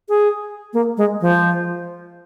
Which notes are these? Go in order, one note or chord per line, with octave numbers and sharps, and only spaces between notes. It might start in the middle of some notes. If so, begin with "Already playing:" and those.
G#4
A#3
G#3
F3